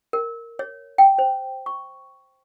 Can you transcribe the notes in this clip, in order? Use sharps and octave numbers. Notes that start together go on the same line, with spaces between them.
A#4
C#5
G5
C5
C#6